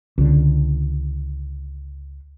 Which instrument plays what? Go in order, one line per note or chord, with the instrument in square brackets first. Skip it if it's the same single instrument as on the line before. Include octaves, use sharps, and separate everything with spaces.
[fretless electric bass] C#2 D3